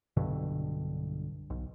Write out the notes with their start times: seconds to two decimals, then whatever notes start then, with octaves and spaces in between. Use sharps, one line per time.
0.17 B1 G2 B2 D3
1.50 B1